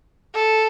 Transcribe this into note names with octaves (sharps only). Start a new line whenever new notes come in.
A4